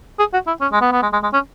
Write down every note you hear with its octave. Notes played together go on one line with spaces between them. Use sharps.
G#4
F#4
E4
C#4
G#3
B3
B3
G#3
G#3
G#3
C#4